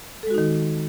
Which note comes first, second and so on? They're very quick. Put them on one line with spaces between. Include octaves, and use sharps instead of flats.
A4 G#3 F#4 D#4 D#3